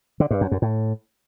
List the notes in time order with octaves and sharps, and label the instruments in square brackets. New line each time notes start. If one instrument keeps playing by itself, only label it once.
[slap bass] D3
G2
F#2
F#2
A2